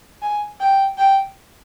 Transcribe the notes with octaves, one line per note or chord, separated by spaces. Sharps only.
G#5
G5
G5